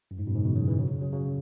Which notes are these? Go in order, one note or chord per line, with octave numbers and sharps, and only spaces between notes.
F#2
G#2
F#2 B2
G#2 C#3
B2 E3
C#3 F#3
E3 G#3
C#3 F#3
C#3 F#3
C#3 F#3